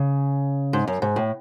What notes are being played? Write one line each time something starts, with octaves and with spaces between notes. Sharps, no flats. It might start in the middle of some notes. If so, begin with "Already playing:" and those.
Already playing: C#3
G#2
F#2
G#2
A2